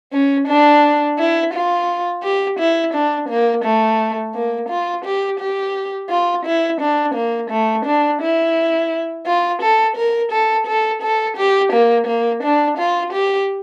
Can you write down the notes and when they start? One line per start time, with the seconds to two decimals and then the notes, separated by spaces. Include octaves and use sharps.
0.13 C#4
0.48 D4
1.19 E4
1.54 F4
2.23 G4
2.59 E4
2.94 D4
3.30 A#3
3.65 A3
4.34 A#3
4.69 F4
5.05 G4
5.40 G4
6.10 F4
6.45 E4
6.81 D4
7.15 A#3
7.51 A3
7.86 D4
8.21 E4
9.27 F4
9.62 A4
9.97 A#4
10.32 A4
10.67 A4
11.02 A4
11.37 G4
11.73 A#3
12.07 A#3
12.43 D4
12.78 F4
13.13 G4